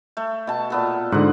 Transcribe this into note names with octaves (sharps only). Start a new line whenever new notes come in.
A3
B2 A5
A#2 B3 A4
G#2 D3 D#5 F#5